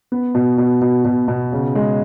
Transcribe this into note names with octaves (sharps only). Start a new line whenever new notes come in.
B3
B2
B2
B2
B2
B2
C#3
G#3